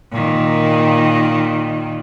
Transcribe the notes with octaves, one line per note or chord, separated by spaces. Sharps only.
A#2 D#3